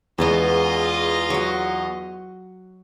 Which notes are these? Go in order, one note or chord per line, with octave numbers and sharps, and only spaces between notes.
E2 G#3 B3 C#4 F4 D#5
F#3 F#4